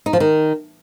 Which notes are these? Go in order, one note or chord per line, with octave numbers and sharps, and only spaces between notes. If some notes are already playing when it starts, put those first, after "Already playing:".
D#4
F3
D#3